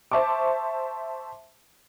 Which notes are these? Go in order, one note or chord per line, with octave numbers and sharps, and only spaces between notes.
C5 E5 A5 C#6 D6